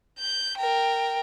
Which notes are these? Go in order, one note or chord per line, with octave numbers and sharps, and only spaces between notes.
G6
A#4 G5